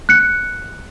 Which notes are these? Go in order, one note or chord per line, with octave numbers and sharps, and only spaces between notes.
F#6 C#7